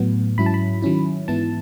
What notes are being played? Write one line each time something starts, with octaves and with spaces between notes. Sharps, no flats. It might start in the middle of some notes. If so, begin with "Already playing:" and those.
Already playing: A2 F#3 B3
G#2 F#3 C#4 E4 B5
A5
B5
D#3 F#3 C#4 E4
G#2 E3 B3 E4 A5